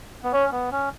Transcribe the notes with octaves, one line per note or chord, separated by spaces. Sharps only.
B3
C#4 C#5
B3
C#4